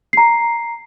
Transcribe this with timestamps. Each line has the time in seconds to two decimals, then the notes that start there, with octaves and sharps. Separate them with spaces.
0.13 A#5 C7